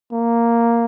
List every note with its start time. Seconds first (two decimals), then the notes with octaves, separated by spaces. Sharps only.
0.12 A#3